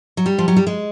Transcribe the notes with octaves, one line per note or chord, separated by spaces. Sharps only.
F#3
G3
F3
F#3
G3
G#3